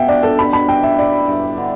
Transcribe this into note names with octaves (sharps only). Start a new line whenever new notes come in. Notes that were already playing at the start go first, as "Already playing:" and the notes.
Already playing: B2 E5 G5
D4 D5
A4
G4 B5
B5
E4 G5
E5
E4 D5
G2
D3